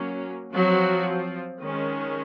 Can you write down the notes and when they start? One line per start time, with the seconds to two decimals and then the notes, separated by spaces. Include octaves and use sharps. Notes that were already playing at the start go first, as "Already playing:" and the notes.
Already playing: F#3 A#3 C#4
0.53 F3 F#3 C4 F#4
1.62 D#3 G#3 C#4